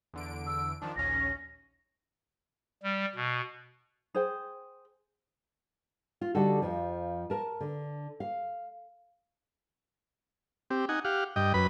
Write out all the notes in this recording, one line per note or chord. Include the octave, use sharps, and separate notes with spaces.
E2 D3 D7
E6
D#3 F3 D4 A5
A#1 D#2 C#4 A#6
G3
B2
G#4 C5 G5
F4
D3 G3 D#4 F#4 A4
F2 F3
A#4 A5
D3
F5
C4 G4
D#4 F#5 G#5
G4 F5 F#5
G2 D#5 G5
F#2 B4 B5